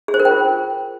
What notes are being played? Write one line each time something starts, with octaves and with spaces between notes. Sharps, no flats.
G#4
C5
A#4
G5
F4